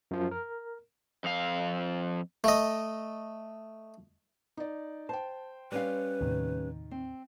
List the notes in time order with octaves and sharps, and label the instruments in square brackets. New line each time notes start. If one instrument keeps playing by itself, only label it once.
[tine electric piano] F#2 F3
A#4
[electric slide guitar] F2 F5
[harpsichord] A3 D#5
[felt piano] D#4 D5
[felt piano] C5 G5 [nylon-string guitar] A5
[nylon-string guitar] G3 C#4 F5 [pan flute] B4
[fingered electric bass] D#2 A2 C3 [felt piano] D#3
[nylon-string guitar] C4